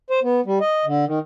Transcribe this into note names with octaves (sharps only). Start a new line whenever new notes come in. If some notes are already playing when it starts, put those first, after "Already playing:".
C5
B3
G3
D#5
D3
D#3